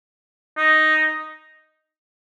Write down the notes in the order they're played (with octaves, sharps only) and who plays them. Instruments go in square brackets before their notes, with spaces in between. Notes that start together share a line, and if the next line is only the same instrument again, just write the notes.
[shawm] D#4